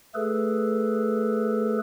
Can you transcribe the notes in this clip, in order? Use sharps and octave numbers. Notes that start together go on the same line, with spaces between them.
A3 G#4 A4 B4